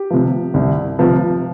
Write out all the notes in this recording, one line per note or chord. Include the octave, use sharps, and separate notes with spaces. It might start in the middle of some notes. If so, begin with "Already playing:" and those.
Already playing: G4
C3 F3
C2
C3 F3